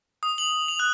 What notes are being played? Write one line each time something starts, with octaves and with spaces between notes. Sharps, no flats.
D#6
F#7
F7
F#6